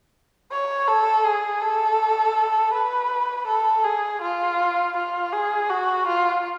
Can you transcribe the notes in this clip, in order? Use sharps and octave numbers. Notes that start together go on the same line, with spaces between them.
C#5
A4
G#4
A4
B4
A4
G#4
F4
F4
G#4
F#4
F4